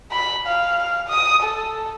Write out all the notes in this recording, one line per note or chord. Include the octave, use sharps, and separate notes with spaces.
B5
F5
D#6
A4